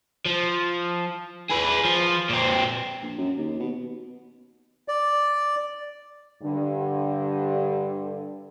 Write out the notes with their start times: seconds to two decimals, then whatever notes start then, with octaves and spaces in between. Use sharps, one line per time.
0.26 F3
1.50 G#4 B4
1.84 F3
2.29 A#2 C4
3.02 A#1
3.18 F#2
3.37 D#2
3.60 B2
4.88 D5
6.43 G2 D3